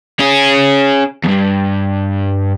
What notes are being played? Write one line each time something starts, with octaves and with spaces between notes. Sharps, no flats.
C#4 G#4
E2 G2